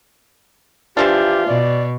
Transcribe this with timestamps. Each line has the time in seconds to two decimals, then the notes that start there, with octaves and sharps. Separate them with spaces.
0.97 E3 F3 D4 F4 G4
1.47 B2 D5